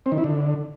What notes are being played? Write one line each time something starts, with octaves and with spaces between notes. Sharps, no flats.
C4
D#3
E4
D3